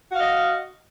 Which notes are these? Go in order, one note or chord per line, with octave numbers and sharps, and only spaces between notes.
F#4 D#5 F5